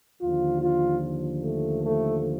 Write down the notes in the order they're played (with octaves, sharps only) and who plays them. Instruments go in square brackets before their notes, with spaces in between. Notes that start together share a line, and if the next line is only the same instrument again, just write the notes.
[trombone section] D#2 D3 F3 F4
F4
A3
A3